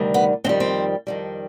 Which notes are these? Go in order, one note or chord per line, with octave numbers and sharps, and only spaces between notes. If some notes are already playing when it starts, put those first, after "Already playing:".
Already playing: D2 C3 D#3 G3
B3
F2 D#3 G3 C4
C4
F2 D#3 G3